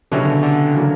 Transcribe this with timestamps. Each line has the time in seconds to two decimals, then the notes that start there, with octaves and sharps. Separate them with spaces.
0.12 B2 D3 F#3 C#4 E4 G4
0.19 C#3
0.25 D3
0.43 D3
0.74 C#3 E3 F#3 A#3